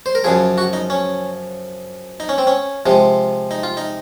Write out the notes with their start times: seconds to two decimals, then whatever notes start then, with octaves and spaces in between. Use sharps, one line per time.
0.06 C5
0.15 A#4
0.24 F#2 C#3 F3 G#4
0.58 F#4
0.73 D#4
0.90 C#4
2.20 D#4
2.29 C#4
2.38 C4
2.47 C#4
2.86 C3 F3 G#3
3.51 D#4
3.63 F4
3.77 D#4